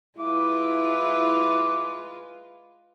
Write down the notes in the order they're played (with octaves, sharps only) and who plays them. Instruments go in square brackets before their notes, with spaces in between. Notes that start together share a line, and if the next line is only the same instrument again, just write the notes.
[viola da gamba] G#3 F4 B4 [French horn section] E4 [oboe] D6